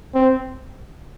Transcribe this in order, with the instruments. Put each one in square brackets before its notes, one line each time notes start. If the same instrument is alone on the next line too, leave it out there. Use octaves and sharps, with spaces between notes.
[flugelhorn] C4